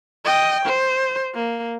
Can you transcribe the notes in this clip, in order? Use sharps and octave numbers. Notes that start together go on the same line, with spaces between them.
D#5 G5
C5
A#3